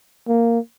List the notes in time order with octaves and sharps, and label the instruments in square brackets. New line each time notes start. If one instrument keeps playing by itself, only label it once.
[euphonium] A#3